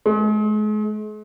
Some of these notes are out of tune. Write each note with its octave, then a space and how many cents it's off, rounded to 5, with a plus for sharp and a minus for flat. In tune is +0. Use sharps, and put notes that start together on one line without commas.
G#3 +40